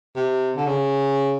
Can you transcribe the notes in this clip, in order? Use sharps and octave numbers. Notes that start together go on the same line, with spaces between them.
C3
D3
C#3